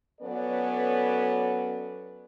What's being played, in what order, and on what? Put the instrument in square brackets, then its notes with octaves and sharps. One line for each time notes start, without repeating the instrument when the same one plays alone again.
[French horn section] F#3 B3 C#4 A4 B4 D5